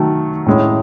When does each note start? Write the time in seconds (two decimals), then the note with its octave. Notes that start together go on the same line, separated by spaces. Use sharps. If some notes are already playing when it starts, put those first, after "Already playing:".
Already playing: D#3 F#3 A3
0.46 A2 G#3 C#4 E4